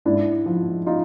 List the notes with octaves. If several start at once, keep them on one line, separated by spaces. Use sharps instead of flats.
G#2 D4 E4
F3
D#4 F4